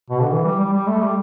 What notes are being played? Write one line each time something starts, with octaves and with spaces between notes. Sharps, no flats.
B2
D3
E3
G3
G3
G3
A3
G3